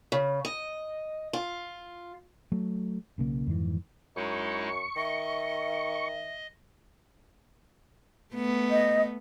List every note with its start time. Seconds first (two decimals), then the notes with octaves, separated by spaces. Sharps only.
0.12 C#3
0.45 D#5
1.33 F4
2.52 F#3 A3
3.18 B1 C#3 A#3
3.47 F2 G#2 D#3 E3
4.16 F#2 G#3 D#4 E4 C#6
4.96 D#3 D#5 E5
8.33 A3 B3
8.70 D#5